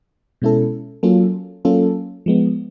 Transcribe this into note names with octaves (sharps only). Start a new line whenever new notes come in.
B2 G#3 C#4 E4 A4
F#3 A#3 C#4 F4 A4
F#3 A#3 C#4 F4 A4
F3 G#3 B3